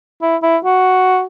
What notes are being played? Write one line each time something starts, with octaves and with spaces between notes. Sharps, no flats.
E4
E4
F#4